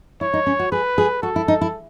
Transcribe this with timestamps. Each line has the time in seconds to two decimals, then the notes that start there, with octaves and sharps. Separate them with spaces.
0.21 E4 C#5
0.34 D#4
0.46 C#4
0.59 F#4
0.72 G#4 B4
0.98 G#4
1.22 F#4 A4
1.36 E4
1.48 D#4
1.61 E4